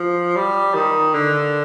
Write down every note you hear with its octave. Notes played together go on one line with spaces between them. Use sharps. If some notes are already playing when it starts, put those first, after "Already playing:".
Already playing: F3
G3
D#3
D3